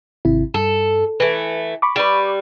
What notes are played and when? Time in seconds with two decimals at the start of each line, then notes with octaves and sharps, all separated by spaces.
0.25 G#1 C3 E4
0.54 G2 A4
1.20 E3 A3 B4
1.82 B5 C#6 D6
1.96 G3 B4